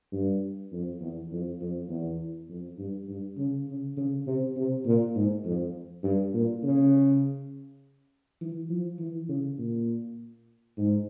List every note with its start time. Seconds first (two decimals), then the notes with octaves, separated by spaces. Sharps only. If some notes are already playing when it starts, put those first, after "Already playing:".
0.12 G2
0.72 F2
1.01 E2
1.31 F2
1.60 F2
1.89 E2
2.49 F2
2.78 G2
3.08 G2
3.38 C#3
3.68 C#3
3.97 C#3
4.27 C3
4.56 C3
4.86 A#2
5.15 G#2
5.45 F2
6.03 G2
6.34 A#2
6.64 C#3
8.41 E3
8.69 F3
8.99 E3
9.29 C#3
9.58 A#2
10.77 G#2